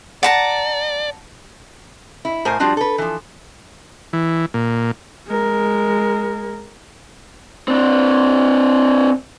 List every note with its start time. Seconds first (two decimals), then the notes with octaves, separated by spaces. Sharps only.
0.23 D5 F#5 A5 A#5
2.25 E4
2.45 A2 A#4 C5 G#5
2.60 F3 G3 D4 F4 F#4
2.77 A4 B4
2.98 E3 F3
4.13 E3
4.54 A#2
5.27 G#3 A#4
7.68 C4 D4